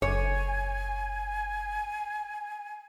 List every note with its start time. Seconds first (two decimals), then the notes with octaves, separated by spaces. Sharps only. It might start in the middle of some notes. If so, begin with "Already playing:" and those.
0.02 F#1 C#5 G#5